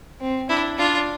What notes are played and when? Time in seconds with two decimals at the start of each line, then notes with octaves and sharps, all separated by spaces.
0.21 C4
0.49 D4 E4
0.78 D4 F4